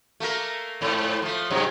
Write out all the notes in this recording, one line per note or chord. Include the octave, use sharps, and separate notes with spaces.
A3 A#3 A#4
F2 G#2
F3 A3
G2 C3 F#3